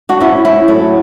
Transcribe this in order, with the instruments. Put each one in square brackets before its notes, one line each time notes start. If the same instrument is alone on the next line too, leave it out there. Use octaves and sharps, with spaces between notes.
[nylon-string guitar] D4 F#4
C#4 E4
C#4 E4
F#3 A3